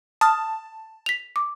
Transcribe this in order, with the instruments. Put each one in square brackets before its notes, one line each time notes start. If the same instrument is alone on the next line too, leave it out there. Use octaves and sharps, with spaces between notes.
[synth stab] A5 [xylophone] D#6 F6
[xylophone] B6 F7
D6